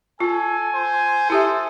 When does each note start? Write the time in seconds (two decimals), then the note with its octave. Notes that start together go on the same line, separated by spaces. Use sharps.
0.20 F4 A4 G#5
0.74 C5
1.30 E4 G4 A4 E5